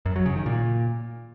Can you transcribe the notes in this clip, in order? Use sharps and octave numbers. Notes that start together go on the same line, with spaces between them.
F#2
F#3
C#3
D#3
A#2